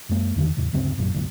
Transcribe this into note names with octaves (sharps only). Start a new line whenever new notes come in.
F#2 G#3 A#3
E2 D3 D#3
E2 A2 C#3
D2 G2 C#3 C4
A#1 F#2 A#2
F#1 B1 A2 D3